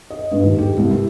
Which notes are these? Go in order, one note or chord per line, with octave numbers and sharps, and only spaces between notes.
D#5
G2
D#2
G4
C2
E4